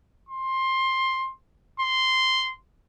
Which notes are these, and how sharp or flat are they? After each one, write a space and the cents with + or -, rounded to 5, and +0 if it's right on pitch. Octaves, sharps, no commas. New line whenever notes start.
C6 +15
C6 -5